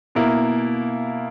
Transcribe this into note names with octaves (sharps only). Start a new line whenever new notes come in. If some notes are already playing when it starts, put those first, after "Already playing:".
B2 A#3 E4 A#4